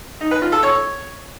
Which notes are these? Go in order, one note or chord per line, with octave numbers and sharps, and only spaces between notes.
D#4
B4
F4
A4
C#5